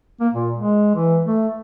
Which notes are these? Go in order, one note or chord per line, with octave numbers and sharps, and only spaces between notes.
A#3
A#2
G#3
E3
A3